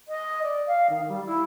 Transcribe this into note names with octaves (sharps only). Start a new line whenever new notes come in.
D#5
D5
F5
D#3
G3
E4